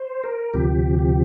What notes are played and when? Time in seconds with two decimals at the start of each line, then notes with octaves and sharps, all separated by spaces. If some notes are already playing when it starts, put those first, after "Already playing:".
Already playing: C5
0.24 A#4
0.54 D2 C3 F3 G4
0.99 G4